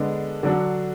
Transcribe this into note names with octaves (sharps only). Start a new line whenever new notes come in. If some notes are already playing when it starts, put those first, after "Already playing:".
Already playing: D3 G#3 B3 D4
D3 F#3 D4 F#4